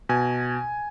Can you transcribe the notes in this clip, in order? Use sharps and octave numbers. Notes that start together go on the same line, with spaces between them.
B2 G#5